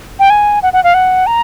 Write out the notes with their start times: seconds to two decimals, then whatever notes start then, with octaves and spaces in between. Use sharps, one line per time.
0.19 G5
0.30 G#5
0.63 F#5
0.73 F#5
0.84 F5
0.94 F#5
1.27 A#5